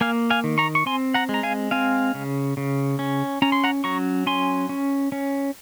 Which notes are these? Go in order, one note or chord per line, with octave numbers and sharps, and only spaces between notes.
A#3 F5 G#5
F5 G#5
D#3
A#5 C#6
C#6
C4 G#5 C6
F#5 A#5
G#3
A#5
F5 G#5
C4 F5 G#5
C#3
C#3
C#4
C#4 A#5
C6
F#5 A#5
F#3 A#5 C#6
C#4 G#5 C6
C#4
C#4